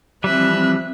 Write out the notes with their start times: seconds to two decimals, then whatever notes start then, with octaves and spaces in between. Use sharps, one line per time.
0.24 E3 F3 G3 C4 E5 F#6